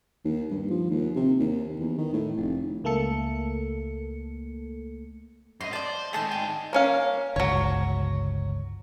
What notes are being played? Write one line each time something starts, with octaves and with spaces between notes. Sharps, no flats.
D#2
G2
F3
D#2
C3
D#2
E2
D#3
A2
F1
C#2 A3 A#3 A4 C#7
F#2 D#5 C6
C5 D5 A5
D#3 A3 G#4 A5 G6
G5
A#3 C#4 F5
G1 C#2 F#3 C#5